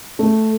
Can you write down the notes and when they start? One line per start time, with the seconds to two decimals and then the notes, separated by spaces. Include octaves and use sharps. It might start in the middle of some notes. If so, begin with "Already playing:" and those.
0.19 A3